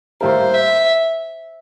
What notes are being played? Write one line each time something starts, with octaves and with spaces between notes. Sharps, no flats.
A2 G3 A#3 E4 A#4 C5
E5